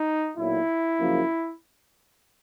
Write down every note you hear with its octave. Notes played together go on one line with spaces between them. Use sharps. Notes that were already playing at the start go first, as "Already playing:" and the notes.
Already playing: D#4
B1 A#2 F#3 E4
F#2 C#3 F3 A#3